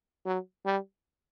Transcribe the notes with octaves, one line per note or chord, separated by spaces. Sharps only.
F#3
G3